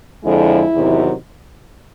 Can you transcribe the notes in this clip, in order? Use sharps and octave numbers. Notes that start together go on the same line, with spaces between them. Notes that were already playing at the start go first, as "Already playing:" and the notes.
F2 D3 F3 G#3 E4
E2 C3 D#3 F#3